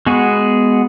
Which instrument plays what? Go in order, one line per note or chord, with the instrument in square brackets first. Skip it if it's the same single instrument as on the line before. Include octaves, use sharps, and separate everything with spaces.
[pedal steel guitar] G#3 F#4 G#4 [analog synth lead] B3